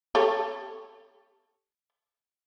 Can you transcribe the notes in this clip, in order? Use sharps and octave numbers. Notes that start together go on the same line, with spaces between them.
G4 A4 C#5